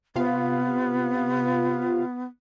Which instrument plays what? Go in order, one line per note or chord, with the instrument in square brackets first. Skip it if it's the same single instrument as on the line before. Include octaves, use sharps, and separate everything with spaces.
[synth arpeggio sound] C3 F4 F5 [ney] B3